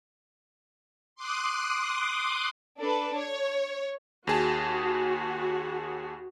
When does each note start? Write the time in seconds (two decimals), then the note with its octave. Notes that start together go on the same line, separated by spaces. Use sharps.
1.16 C6 D6 D#6 F#6
2.78 D4 A4 B4
3.16 C#5
4.27 D#2 F#4 G#4 A5